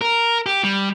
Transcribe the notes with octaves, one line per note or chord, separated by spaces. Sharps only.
A#4
G4
G3